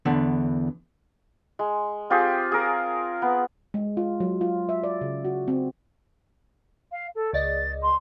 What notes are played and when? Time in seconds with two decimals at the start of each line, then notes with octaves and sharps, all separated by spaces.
0.05 E2 D3 B3
1.59 G#3
2.10 C4 F4 G4 G#4
2.52 G#4 A#4
3.22 B3
3.74 G#3
3.97 F4
4.20 F#3
4.41 F4
4.69 E5
4.84 D5
5.01 C#3
5.25 F#4
5.48 C4
6.91 F5
7.15 A4
7.33 C#2 D5 D#5 A6
7.82 C6